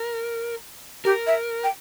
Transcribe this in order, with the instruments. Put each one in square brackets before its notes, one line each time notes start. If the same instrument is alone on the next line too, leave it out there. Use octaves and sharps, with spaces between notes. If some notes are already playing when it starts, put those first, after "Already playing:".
Already playing: [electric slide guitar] A#4
[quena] G4 [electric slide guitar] A#4
[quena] E5
G5